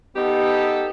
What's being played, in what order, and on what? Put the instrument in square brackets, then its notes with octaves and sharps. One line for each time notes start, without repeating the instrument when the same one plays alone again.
[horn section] B3 D#4 G4 A4